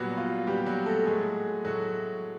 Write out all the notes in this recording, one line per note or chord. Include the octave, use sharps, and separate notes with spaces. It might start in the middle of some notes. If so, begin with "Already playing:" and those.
Already playing: A#2 F#3 G3 B3 F#4
F4
A#2 G3 B3 G4
F#3 F#4
A3 A4
A2 F#3 G#3 A3 G#4
A2 F#3 A3 F#4